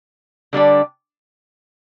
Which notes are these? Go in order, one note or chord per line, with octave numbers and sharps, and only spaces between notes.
D3 G3 D4 G4